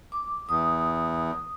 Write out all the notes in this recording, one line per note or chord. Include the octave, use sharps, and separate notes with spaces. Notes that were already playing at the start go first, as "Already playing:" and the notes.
D6
E2 D#6